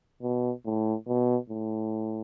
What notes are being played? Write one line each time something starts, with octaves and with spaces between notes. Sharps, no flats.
B2
A2
B2
A2